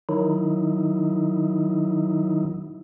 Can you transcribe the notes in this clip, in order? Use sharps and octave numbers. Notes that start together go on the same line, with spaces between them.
D#3 F#3 D#4 E4